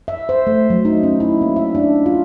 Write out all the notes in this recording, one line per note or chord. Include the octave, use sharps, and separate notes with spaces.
E5
C5
A3
F#3
D#4
C#4
E4
A#3
E5
D4
F4